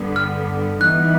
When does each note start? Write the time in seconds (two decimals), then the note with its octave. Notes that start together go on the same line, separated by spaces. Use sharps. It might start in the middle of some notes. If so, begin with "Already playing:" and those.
Already playing: G2 D3 G3 B3
0.16 F6
0.81 E3 G3 B3 D#4 F#6